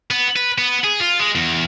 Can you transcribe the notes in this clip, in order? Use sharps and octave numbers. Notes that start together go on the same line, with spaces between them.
B3
B4
B3
G#4
F4
G#3
E2